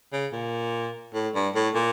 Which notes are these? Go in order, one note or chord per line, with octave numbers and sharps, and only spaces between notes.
C#3
A#2
A2
G2
A2
A#2